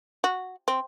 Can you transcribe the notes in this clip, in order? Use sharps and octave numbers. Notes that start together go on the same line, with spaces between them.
F#4
C4